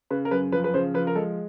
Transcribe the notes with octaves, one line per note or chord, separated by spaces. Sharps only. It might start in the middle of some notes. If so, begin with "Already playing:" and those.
C#3 B4
A#4
F#2 B4
F3 B4
B4
C#3 C5
F3 B4
A#4
G#3 A4